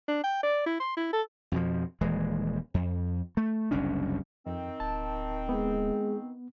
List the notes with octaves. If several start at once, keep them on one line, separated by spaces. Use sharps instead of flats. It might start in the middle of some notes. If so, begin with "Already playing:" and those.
D4
G5
D5
E4
C6
E4
A4
F2 B2 F3
D#1 E3 G#3
F2
A3
F#1 C2 C#4 D4
F2 D#3 C4
D1 A5
G#3 B3